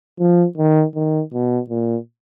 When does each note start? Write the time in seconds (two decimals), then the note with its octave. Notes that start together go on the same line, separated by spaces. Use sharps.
0.19 F3
0.58 D#3
0.95 D#3
1.33 B2
1.70 A#2